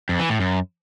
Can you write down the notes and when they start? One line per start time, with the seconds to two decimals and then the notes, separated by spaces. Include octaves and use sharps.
0.09 F2
0.19 E3
0.29 A2
0.40 F#2